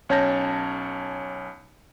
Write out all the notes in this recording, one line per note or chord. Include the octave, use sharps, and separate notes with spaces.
B1 C#4 C#5 A5 G6 A#6